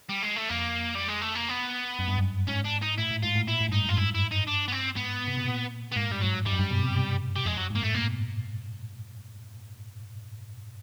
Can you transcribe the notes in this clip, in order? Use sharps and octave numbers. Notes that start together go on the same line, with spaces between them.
G3
G#3
A3
F2 A#3
G3
G#3
A3
A#3
B3
F#2
G2
F#2
G#2 C#4
D4
D#4
A2 E4
A2
G#2 F4
A2
A#2 E4
A2
G2
G#2 D#4
F#2
G#2 F4
G2 E4
E4
D#4
D4
B3
C4
G#2 B3
C3
B2
A#2
B3
G#2 A#3
G2 G3
G#2 F#3
G2 G3
F#2
G2
B2
C3
G3
F2 G#3
F#2 F#3
G#2
A#3
A2 A3
A#2 A#3
B2